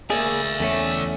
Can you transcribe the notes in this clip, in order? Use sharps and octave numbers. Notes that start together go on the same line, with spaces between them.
A#3 G#4 D5 E5
E2 A3 C#4